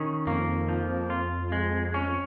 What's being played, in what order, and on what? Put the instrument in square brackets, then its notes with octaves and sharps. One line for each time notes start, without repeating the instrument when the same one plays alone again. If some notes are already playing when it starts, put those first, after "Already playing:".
Already playing: [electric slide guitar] D#3 C#4
[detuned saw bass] F2 [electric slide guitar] A#3
[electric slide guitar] F3
F4
G#3
C#4